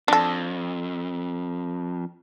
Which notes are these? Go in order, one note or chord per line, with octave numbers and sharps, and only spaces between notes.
F2 D4 A4